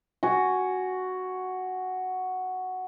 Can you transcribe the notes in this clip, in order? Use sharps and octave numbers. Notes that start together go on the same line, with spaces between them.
F#4 G#5